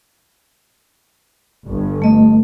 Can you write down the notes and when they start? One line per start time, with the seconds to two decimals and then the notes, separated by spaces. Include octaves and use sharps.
1.67 G1
2.02 A3 D#5